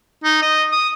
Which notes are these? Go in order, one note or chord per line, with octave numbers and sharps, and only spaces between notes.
D#4
D#5
D#6